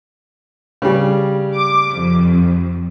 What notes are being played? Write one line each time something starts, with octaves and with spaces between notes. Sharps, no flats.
C#3 G3
D6
F2